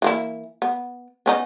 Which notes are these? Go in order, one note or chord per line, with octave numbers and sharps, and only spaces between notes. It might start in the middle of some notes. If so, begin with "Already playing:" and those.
E3 A#3 E4
B3
B3 C#4 D#4